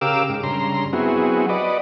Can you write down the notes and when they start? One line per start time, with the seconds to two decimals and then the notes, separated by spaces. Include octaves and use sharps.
0.01 C#3 G4 A#4 F5 D6 E6
0.29 G#2
0.43 G2 C#3 A#5 C6
0.93 F#3 B3 C4 E4 F#4 G#4
1.49 F#4 B4 D5 D#5